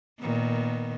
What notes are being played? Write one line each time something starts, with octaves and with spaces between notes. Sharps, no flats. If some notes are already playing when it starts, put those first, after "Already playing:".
A#2 D#3 B3